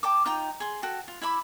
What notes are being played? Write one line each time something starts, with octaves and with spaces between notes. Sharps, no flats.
G5 A5 D6
D#4 F4 G5
G#4 C6
F#4 A4 G5 A5
F4
E4 E5 B5 D6